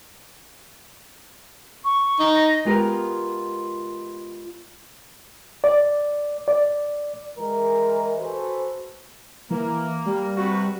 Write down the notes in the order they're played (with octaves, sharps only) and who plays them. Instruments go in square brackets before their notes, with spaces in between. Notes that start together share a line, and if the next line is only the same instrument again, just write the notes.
[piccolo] C#6
[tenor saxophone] D#4
[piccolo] A#6
[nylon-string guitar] G#3 B3 F4 G4 A#4 B4
[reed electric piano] D5
D5
[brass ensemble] E3 G#3 A#4
F#4 G#4 A4 B4 C5
[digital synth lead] E3 [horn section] A#3
[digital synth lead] G3
[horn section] C3 F#4 B4